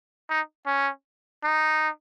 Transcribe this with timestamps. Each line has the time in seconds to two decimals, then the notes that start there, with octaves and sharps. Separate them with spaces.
0.29 D#4
0.66 C#4
1.43 D#4